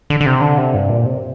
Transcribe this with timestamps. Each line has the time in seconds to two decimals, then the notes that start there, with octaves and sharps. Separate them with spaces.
0.10 D3
0.20 D3
0.26 C3
0.41 D3
0.58 C3
0.74 G2
0.90 A#2
1.05 C3